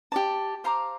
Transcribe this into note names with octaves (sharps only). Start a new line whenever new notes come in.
G4 D5 A5
C5 F5 A#5 D6